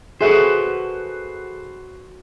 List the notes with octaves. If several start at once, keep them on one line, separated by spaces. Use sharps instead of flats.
F#4 G#4 A4 B4 C5 E5